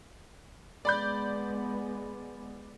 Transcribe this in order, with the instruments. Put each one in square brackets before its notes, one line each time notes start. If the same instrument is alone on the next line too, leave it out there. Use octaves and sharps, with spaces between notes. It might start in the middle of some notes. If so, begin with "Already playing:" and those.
[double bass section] G#3 B3 [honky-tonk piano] D5 B5 G6